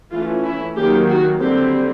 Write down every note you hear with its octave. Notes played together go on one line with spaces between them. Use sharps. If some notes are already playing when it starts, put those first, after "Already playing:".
E3 A3 C#4 F4
E4
D#3 F#3 A#3 G4
F#4
D3 G3 C4 G4